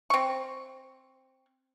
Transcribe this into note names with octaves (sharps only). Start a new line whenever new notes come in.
C4 C#6